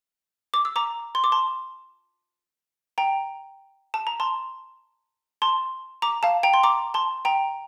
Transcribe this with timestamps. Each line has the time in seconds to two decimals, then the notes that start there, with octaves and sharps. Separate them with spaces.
0.54 D6
0.65 E6
0.76 A#5 D6
1.15 C6
1.24 D6
1.32 A5 C6
2.98 G5 A#5
3.94 A5
4.07 A#5
4.20 A5 C6
5.42 A5 C6
6.02 A#5 D6
6.23 F5 A5
6.43 G5 A#5
6.54 C6
6.63 A#5 D6
6.94 A5 C6
7.25 G5 A#5